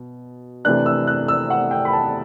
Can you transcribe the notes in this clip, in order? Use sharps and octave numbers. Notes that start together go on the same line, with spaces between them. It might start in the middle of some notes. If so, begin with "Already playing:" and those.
Already playing: B2
C3 E3 A3 D4 F#6
E6
F#6
E6
F#5
G5
B5
A5